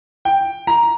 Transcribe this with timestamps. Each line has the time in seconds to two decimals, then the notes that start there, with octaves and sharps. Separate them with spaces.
0.25 G5
0.67 A#5